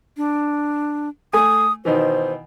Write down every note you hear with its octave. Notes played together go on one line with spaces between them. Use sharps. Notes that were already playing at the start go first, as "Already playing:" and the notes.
D4
A3 G#5 D#6
B2 D#3 E3 C5